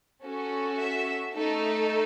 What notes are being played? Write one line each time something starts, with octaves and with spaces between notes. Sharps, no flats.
C#4 F#4 A4
E5
A3 D#4 A4